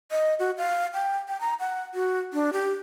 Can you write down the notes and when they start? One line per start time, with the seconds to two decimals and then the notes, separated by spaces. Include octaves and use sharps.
0.11 D#5
0.39 F#4
0.58 F5
0.94 G5
1.28 G5
1.41 A#5
1.60 F#5
1.94 F#4
2.33 D4
2.53 G4